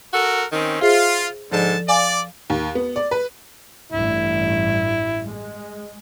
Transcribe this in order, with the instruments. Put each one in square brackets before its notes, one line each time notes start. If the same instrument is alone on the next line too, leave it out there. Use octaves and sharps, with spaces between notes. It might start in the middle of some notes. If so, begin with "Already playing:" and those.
[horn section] F#4 A4 A#4
D#3 C4 C#4
[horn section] F4 [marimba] G#4 C5 E5
[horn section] G#2 D3 A5 [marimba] F3 A4 D5
[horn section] D5 [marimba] F5 G#5
[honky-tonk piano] D#2
B3
D5
B4
[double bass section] A1 G2 [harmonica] E4
[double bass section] G#3